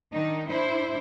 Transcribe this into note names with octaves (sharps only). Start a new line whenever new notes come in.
D#3 D4 D#4
D4 E4 C5